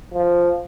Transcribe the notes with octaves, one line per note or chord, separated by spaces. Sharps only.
F3